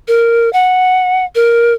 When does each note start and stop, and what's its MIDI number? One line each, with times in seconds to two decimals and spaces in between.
0.08 0.51 70
0.53 1.25 78
1.35 1.73 70